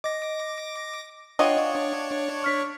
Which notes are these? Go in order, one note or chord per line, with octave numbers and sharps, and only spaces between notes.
D#5 D6 A#6
D4 F4 F#4 C#5 D#5 F5 G5 D6
C#6 F6 B6